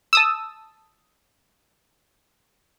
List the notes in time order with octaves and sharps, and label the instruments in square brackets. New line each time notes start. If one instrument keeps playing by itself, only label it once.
[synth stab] A5 D#6 E6